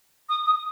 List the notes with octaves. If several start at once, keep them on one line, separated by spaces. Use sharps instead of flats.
D#6
D#6